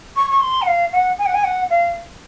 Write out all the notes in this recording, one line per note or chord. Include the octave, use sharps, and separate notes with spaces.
C#6
C#6
C6
F#5
F5
F#5
G#5
F#5
G#5
F#5
F5